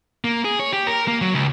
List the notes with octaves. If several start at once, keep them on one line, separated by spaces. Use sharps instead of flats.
A#3
G#4
C#5
G4
A#4
A#3
F#3
C#2